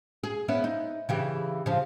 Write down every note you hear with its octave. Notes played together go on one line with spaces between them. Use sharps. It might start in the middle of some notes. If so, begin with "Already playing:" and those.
G#4
B3 C#4 E4
D#4
C#3 E3 G4
C#3 F3